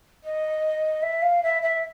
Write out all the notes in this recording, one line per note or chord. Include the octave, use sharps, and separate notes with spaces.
D#5
E5
F5
E5
E5